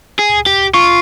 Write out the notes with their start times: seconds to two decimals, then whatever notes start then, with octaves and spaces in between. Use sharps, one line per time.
0.19 G#4
0.46 G4
0.74 F4 C#6